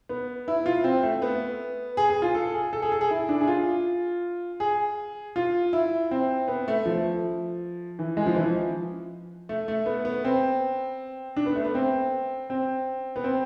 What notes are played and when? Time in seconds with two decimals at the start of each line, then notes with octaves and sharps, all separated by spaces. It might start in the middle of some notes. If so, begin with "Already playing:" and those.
0.09 B3
0.48 E4
0.66 F4
0.84 C4
1.03 A3
1.22 B3
1.97 G#4
2.10 G#4
2.22 F4
2.34 A4
2.54 G#4
2.73 A4
2.82 G#4
2.92 A4
3.01 G#4
3.11 E4
3.29 D4
3.41 G#4
3.47 F4
4.60 G#4
5.36 F4
5.73 E4
6.11 C4
6.48 B3
6.68 A3
6.86 F3
7.99 E3
8.17 G#3
8.26 F3
8.35 E3
8.43 F3
9.49 A3
9.68 A3
9.86 B3
10.05 B3
10.25 C4
11.37 D4
11.46 B3
11.55 A3
11.65 B3
11.75 C4
12.50 C4
13.16 B3
13.24 C4